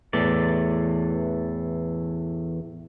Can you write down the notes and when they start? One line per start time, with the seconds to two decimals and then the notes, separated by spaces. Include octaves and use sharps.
0.13 E2 A2 E3 D5